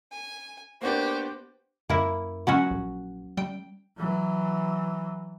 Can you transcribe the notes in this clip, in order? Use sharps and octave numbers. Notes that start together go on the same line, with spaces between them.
G#5
A#3 B3 D4 F#4 G4 C5
F#2 A#3 E4
F#3 C#4 F#4
A#1
G3 G5
E3 F#3